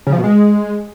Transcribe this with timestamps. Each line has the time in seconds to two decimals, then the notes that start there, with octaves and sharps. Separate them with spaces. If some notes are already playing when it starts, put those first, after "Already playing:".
0.07 C#3
0.12 F3
0.18 B2
0.24 G#3